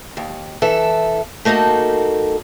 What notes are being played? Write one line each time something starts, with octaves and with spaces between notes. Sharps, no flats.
D#2
E3 A4 E5
A3 A#3 D#4 F#4 A4